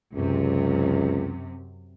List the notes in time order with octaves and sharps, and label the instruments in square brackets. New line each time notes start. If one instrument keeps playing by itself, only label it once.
[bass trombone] C#2 [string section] F#2 C3